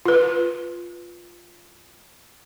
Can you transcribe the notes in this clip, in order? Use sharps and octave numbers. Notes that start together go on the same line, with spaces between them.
F4 B4